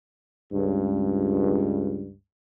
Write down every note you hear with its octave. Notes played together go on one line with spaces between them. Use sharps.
C#2 G2